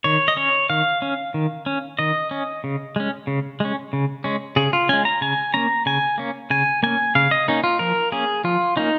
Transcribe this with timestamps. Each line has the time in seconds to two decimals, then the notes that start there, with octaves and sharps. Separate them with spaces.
0.04 D#3 C#5
0.28 D#5
0.37 C#4 C#5
0.70 D#3 F5
1.02 C#4
1.34 D#3
1.66 C#4
1.99 D#3 D#5
2.31 C#4
2.64 C#3
2.96 G#3 C#4
3.27 C#3
3.60 G#3 C#4
3.93 C#3
4.24 G#3 C#4
4.56 C#3 G#4
4.73 F4
4.89 G#3 C#4 G#5
5.05 A#5
5.21 C#3 G#5
5.54 A#3 C#4 A#5
5.86 C#3 G#5
6.18 A#3 C#4
6.50 C#3 G#5
6.83 A#3 C#4 G#5
7.15 C#3 F5
7.31 D#5
7.48 A#3 C#4 D#4
7.64 F4
7.79 F3 A#4
8.12 A#3 C#4 G#4
8.44 F3 F4
8.76 A#3 C#4 D#4